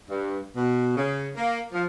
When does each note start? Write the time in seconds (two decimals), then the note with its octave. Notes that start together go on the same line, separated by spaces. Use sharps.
0.09 G2
0.56 B2
0.96 C#3
1.36 A#3
1.73 F3